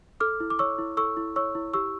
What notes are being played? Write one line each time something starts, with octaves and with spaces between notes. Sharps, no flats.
A4 D6 F6
E4
D6
C#5 C#6 E6
E4
A4 C#6 E6
E4
C#5 C#6 E6
E4
G4 C#6 E6